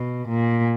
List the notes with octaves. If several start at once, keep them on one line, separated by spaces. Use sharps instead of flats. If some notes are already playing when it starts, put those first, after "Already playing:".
Already playing: B2
A#2